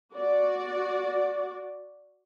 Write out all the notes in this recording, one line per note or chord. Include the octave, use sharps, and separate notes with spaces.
F#4 D5